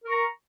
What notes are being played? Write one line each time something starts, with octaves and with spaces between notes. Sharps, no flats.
A#4 A#5 C#6